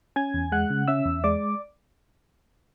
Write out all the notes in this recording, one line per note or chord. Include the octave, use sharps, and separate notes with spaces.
C#4 G#5 G#6
E2
G#3 F#5 F#6
C#3
C#4 E5 E6
E2
G#3 D5 D6